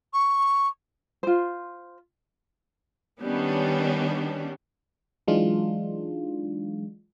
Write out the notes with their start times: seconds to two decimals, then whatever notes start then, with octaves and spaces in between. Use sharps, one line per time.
0.13 C#6
1.23 F4 C5
3.20 D#3 G3 B3 C#4 D4
5.28 E3 F#3 G#3 D4 D#4 F4